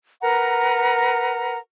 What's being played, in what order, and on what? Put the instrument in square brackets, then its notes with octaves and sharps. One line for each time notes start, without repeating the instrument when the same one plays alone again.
[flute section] A#4 B4 F#5 A#5